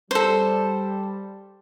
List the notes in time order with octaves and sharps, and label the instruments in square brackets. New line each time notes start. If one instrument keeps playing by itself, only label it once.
[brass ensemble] G3 [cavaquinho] A4 C5